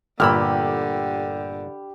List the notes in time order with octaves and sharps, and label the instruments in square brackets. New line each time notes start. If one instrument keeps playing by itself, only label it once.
[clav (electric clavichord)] G1 A#2 [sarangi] D3 [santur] G4 [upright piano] B5 E6 F6